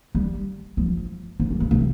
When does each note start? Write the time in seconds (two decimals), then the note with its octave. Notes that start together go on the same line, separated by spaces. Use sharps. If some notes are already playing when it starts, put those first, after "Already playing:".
0.15 G3
0.77 F3
1.40 F3
1.51 F#3
1.60 C#3
1.71 C3